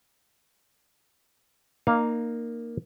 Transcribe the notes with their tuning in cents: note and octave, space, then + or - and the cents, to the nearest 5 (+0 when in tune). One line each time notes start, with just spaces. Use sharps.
A#3 +0 D#4 -30 F5 +0